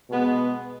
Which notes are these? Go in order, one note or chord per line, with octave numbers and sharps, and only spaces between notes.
B2 G#3 B3